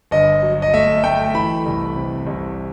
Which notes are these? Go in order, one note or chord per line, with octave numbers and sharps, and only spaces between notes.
G1 D#5
F#3
D#5
A3 E5
A3 G5
E3 B5
C2
C3
C2